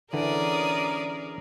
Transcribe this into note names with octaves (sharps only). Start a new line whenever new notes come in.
D3 E3 C#4 G#4 A#4 D5 D#6